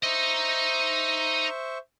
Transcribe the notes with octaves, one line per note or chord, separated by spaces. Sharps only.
D#4 C5 D#5 E5 C#6